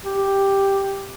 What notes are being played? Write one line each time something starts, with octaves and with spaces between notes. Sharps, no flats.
G4